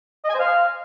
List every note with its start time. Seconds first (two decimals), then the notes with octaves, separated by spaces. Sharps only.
0.24 D#5
0.29 G#5
0.35 C5
0.40 F5